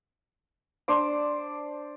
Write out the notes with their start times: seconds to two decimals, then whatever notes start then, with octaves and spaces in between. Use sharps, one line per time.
0.88 D4 C5 D5 D6